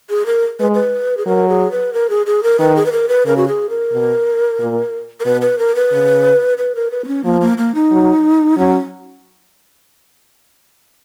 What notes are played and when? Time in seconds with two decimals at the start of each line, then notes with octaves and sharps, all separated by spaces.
0.10 G#4
0.26 A#4
0.60 G#3 B4
0.75 B4
1.17 G#4
1.26 F#3 A#4
1.49 G#4
1.71 B4
1.93 A#4
2.10 G#4
2.26 G#4
2.43 A#4
2.59 D#3 B4
2.76 G#4
2.86 B4
2.92 A#4
3.09 B4
3.26 C#3 A#4
3.37 F#4
3.48 G#4
3.70 A#4
3.92 B2
4.59 A#2
5.20 A#4
5.25 B2 B4
5.41 B4
5.59 A#4
5.75 B4
5.92 C#3
6.58 B4
6.75 A#4
6.91 B4
7.04 B3
7.08 C#4
7.24 F3 A#3
7.41 A#3
7.58 A#3
7.75 D#4
7.91 F#3
8.57 F#3 C#4